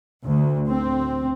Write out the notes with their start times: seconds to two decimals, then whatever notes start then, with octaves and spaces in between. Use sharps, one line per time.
0.24 D2
0.71 C4